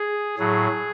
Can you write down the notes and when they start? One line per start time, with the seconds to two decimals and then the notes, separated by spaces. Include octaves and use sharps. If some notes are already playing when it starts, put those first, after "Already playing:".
Already playing: G#4
0.39 A2 F#3 G#4